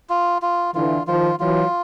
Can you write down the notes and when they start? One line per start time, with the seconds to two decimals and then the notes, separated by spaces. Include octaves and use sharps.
0.10 F4
0.42 F4
0.75 D3 E3 F4
1.07 D#3 F3 F4
1.40 E3 F#3 F4